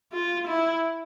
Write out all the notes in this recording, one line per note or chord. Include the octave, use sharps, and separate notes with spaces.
F4
E4